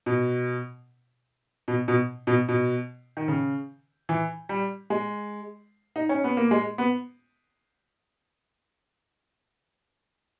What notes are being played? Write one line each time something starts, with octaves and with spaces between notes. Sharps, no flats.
B2
B2
B2
B2
B2
D#3
C#3
E3
G3
G#3
D#4
C#4
B3
A#3
G#3
B3